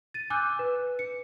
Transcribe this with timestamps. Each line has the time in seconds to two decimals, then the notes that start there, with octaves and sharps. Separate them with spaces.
0.14 A6 D#7
0.30 G#5 D6 E6 F#6 G6
0.59 B4
0.99 C#7